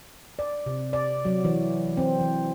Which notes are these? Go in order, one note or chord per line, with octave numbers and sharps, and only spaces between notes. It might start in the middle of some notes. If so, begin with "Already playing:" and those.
D5
C3
D5
F#3
E3
C4
E3